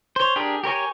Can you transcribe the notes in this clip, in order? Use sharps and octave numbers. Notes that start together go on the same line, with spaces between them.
C5 C#5
D4 G4 G#4 A#4
G4 A#4 C#5 G#5